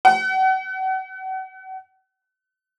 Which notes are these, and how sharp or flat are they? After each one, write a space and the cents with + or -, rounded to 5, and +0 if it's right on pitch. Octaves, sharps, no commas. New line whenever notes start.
F#5 +35